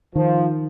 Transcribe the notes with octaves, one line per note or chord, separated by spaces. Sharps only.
D#3 F3